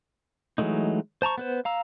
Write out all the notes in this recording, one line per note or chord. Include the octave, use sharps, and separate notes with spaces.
E3 F#3 G#3 A3 D#4
C5 A5 A#5 C#6
B3 B4 C5
F5 A#5 E6